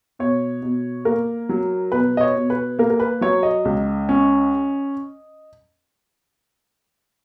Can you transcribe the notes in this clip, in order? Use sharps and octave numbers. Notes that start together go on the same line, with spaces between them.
B2 C#5
B2
A#3 A#4
F#3
B2 B4
D#5
C#5
B2
B4
A#3 A#4
A#4
B4
F#3 C#5
D#5
C#2
C#4